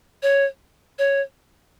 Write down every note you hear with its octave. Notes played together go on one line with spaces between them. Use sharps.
C#5
C#5